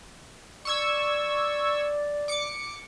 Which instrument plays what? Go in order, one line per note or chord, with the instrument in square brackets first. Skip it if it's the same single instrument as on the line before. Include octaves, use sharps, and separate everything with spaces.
[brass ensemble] D5 [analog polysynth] C#6 E6 G#6
[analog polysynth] D6 C#7